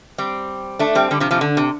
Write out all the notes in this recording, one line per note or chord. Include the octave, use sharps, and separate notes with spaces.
G3 C4
A3 D4
G3 C4
D3 G3
C3 F3
C3 F3
D3
C3